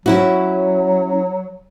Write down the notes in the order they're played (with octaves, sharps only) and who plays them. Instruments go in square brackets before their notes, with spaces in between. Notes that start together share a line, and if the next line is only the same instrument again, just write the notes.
[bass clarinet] F#3 [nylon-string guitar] C#4 E4 F#4